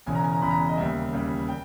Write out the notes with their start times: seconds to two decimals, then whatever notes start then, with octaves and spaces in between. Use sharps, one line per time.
0.06 E1 E2 C#3 G#5
0.15 A#5
0.24 G#5
0.33 A#5
0.42 E1 E2 C#3 B5
0.51 A#5
0.68 D#5
0.77 D#2 C#3 G3 E5
1.13 D#2 C#3 G3
1.49 G5